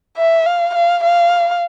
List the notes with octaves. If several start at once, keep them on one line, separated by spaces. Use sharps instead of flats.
E5
F5
F5
F5